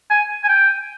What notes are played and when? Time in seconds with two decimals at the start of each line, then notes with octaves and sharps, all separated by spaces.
0.10 G#5
0.44 G#5
0.48 G5